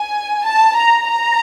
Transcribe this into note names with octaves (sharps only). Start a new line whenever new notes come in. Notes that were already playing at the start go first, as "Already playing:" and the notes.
Already playing: G#5
A5
A#5
A#5